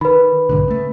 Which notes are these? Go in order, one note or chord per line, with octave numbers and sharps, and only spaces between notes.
D#3 B4 B5
B1 G#2 D3
C#3 A3